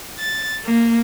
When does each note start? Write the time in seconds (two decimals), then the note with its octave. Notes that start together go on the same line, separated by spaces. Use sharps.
0.18 A6
0.63 A#3